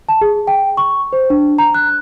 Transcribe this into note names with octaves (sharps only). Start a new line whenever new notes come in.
A5
G#4
G5
C#6
C5
D4
A#5
F#6